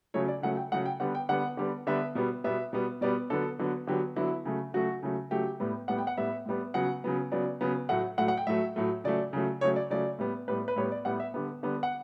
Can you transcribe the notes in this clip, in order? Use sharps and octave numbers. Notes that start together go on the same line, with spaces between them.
C#3 F#3 A3 C#5
D5
C#3 F#3 A3 F#5
G5
C#3 F#3 A3 F#5
G5
D3 G3 B3 F#5
G5
D3 G3 B3 F#5
D3 G3 B3
D3 G3 B3 E5
B2 G3 B3
B2 G3 B3 E5
B2 G3 B3
B2 G3 B3 D5
D3 F#3 B3 A4
D3 F#3 B3
D3 F#3 B3 G4
D3 F#3 B3 E4
C#3 F#3 A3
C#3 F#3 A3 F#4
C#3 F#3 A3
C#3 F#3 A3 G4
A2 G3 B3
A2 G3 B3 F#5
G5
F#5
A2 G3 B3 E5
A2 G3 B3
C#3 F#3 B3 F#5
C#3 F#3 B3
C#3 F#3 B3 D5
C#3 F#3 B3
A2 F#3 A3 F#5
A2 F#3 A3 F#5
F#5
G5
A2 F#3 A3 E5
A2 F#3 A3
C#3 F#3 A3 D5
C#3 F#3 A3
C#3 F#3 A3 C#5
D5
C#3 F#3 A3 D5
A2 G3 B3
A2 G3 B3 B4
B4
A2 G3 B3 C#5
D5
A2 G3 B3 F#5
E5
D3 G3 B3
D3 G3 B3
F#5